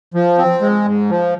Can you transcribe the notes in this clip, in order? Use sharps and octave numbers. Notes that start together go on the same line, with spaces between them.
F3
C4
G#3
G#2
F3